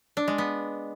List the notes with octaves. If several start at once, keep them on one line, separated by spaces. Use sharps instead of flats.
D4
G#3
B3